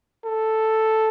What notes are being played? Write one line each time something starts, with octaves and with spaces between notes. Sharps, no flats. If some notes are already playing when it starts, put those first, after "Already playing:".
A4